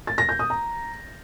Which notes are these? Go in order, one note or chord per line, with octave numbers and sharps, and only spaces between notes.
A6
A#6
G6
D#6
A#5